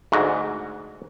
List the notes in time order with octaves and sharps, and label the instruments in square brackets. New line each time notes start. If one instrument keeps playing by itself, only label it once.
[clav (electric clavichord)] D2 G#2 F#4